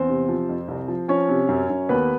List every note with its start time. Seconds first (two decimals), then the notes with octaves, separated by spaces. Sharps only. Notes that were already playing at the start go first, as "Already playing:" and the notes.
Already playing: E2 C4 C5
0.08 C3
0.29 F3
0.49 F2
0.68 C2
0.88 F3
1.08 F3 C#4 C#5
1.29 C3
1.49 F#2
1.70 F#2
1.89 D#2 B3 B4